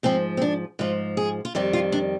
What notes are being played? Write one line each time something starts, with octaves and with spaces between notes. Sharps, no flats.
G#2 F3 C4
C4
D4
G#2 F3 F4
G#4
F4
F2 D#3 G3 G4
F4
D4